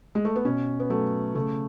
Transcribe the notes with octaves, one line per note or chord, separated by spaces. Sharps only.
G#3
A3
B3
B2 C#4
B3
F#3 A3
C#3 A3